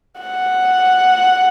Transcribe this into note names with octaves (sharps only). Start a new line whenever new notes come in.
F#5